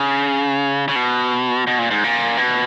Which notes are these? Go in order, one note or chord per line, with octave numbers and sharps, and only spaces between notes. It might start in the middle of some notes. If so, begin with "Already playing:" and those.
Already playing: C#3
C#3
B2
B2
A#2
G#2
A#2
B2